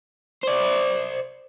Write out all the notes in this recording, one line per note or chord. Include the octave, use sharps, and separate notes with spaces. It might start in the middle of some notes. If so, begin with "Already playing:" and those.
C5 D5